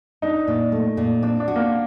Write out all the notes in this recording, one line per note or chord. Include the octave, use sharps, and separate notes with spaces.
D4 D#4
A#2
A3
A#2
C4 D4
D4
F#4
A#3